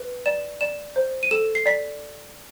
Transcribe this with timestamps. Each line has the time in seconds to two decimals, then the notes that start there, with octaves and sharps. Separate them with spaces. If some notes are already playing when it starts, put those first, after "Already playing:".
Already playing: B4
0.26 D5 E7
0.61 D5 E7
0.96 C5
1.23 D#7
1.31 A4 E7
1.55 C7
1.66 D5 B6